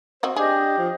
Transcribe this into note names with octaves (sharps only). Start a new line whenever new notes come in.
C4 F#4 C5 D#5
D4 G4 G#4 D#5
F3